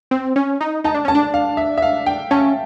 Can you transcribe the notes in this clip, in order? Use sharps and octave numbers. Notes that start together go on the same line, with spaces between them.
C4
C#4
D#4
D#4 A5
D4
C#4 A5
D4
F5
E5
E5
F5
G5
C#4 A5